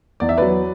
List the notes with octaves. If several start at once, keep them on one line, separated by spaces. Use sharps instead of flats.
E2 D5
E5
F#3 B4 D5